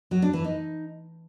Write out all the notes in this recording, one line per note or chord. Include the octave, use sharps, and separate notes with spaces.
F#3
D4
E3
D#4